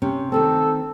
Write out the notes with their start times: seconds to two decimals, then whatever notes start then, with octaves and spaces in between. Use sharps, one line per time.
0.02 C3 C#4
0.32 D#3 A3 C4 A4